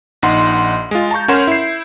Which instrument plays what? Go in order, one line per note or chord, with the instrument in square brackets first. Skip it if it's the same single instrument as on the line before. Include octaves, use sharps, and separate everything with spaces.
[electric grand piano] A#1 D#4 F#5 C6
G#3 F4
A5 A#5 C#6 G6
C#4 A#4 C#5 F#5 C6 E7
E4 C7